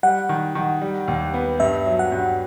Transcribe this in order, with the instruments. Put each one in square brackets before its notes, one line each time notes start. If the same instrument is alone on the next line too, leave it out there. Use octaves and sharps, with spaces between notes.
[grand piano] G3 [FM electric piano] F#5
[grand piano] D#3
D#3
G3
D#2
B3
[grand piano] G2 [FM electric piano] E5
[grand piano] F#3
[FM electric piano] F#5
[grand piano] G2